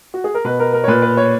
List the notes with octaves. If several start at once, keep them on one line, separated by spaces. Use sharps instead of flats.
F#4
G#4
A#4
B2 B4
A#4
A#4
C#5
A#2 B4
B4
C#5